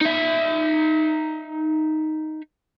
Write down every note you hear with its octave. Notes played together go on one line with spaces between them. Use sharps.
D#4 E5